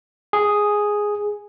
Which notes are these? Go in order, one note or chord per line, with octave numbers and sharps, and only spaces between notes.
G#4